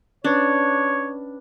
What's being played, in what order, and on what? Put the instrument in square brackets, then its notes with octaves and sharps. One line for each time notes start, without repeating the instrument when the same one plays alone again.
[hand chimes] C#4 B4 [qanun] D4 [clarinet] C#5